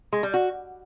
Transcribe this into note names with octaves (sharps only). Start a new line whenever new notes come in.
G#3
G3
F#4